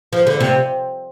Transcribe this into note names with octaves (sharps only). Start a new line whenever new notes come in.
F3
D3
C3